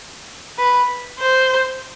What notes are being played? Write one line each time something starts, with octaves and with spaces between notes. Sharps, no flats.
B4
C5